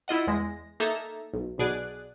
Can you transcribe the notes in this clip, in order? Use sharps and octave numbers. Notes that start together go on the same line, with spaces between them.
E4 F4 D#5 F#5
E2 G#3 A#6
A#3 D#4 A4 E5 A#5
B1
B1 B2 G#4 D5 F#6